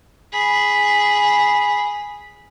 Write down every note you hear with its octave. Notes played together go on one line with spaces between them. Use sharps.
G#4 B5